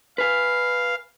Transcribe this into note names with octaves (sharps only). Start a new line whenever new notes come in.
B4 F5 G#5